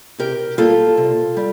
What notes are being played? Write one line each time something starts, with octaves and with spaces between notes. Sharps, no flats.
C3 G4 A#4
G3 A#3 F4 A4
C3
G3